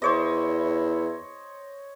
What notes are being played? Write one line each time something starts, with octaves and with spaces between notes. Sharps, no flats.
E2 E4 C5 C#5 D#5